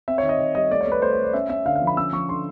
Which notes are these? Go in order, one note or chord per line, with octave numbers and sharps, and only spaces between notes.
C4 E5
C#5
D#3
D#5
D#3
G3 D#5
A3 D5
C#5
A3 B4
A3 C5
C#5
A3
D5
C#4 E5
C#4 E5
D3 F5
F5
F3
B5
C#4 E6
F3 C#6
D3 C6